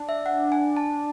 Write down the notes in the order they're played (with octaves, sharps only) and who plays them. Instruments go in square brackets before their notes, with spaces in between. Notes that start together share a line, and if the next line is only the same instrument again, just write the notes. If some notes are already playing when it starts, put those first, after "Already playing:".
Already playing: [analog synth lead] D4
[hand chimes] E5
F#5
G#5
A5